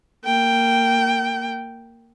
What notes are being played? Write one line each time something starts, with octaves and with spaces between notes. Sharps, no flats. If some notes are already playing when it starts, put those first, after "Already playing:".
A#3 G5